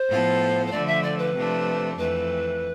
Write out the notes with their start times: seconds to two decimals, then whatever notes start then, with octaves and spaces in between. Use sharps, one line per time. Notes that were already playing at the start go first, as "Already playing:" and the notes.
Already playing: C5
0.08 A2 F3 B3 F4 A4
0.67 C5
0.71 D3 F3 A3 D5
0.87 E5
1.03 D5
1.18 B4
1.34 C3 F3 A3 D4
1.97 F2 E3 A3 B4